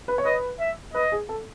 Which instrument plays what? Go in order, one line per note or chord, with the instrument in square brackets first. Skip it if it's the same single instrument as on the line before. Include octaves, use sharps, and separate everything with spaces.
[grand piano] B4
C#5
[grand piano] B4 [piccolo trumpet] D#5
[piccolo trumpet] E5
[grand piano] B4 [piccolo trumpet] D#5
[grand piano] G#4
A4